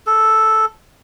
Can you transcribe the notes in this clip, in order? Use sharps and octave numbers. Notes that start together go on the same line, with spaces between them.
A4